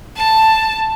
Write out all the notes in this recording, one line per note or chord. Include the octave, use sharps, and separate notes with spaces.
A5